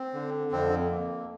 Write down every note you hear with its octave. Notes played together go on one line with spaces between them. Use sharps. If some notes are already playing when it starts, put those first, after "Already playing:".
Already playing: C4
D3
F2 C4
A#3